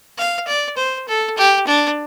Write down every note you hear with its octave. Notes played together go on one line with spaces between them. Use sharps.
F5
D5
C5
A4
G4
D4